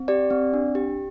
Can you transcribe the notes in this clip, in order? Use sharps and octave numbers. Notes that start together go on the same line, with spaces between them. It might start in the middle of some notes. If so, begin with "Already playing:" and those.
Already playing: C4
G4 D5
C4
D4
G4